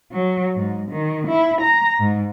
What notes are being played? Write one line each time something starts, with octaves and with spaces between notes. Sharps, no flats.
F#3
G#2
D#3
E4
A#5
G#2